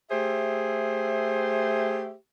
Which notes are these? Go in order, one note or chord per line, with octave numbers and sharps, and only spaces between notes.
A3 G4 G#4 C5 E5